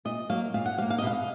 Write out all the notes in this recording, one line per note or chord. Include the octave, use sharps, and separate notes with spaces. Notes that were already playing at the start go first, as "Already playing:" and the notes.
A#2 D#5
F#3 A#3 F5
A#2 F5
F#5
F#3 F5
A#3
F5
D#5
B2 F5